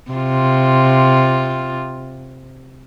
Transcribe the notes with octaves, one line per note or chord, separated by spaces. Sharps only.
C3 F4